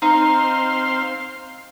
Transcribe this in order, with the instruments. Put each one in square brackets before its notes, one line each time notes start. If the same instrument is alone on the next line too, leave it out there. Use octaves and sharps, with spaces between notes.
[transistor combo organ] C4 F5 C6 [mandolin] D#4